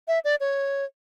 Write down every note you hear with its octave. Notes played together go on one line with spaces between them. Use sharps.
E5
D5
C#5